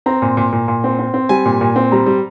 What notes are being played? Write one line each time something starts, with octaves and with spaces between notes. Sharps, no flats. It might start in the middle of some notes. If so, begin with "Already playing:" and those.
C4 A#5
A#2
A#2
A#2
A#2
C4
C4
C4
G3 G#5
A#2
A#2
C4
G3 A#5
G3